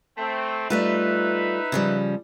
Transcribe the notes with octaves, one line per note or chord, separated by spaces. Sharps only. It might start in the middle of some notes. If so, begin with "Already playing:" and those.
A3 C4
G3 A3 D#4 F4 B4 E5
C#3 F3 G3